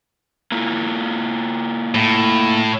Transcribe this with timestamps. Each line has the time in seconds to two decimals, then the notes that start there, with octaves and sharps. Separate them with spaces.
0.52 A#3 E4 F4
1.95 A2